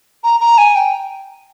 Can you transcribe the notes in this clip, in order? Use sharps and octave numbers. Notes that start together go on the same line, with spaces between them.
A#5
A#5
G#5
G5